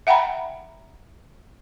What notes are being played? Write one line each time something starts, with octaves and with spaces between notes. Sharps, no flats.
E5 F#5 G5 A#5 B5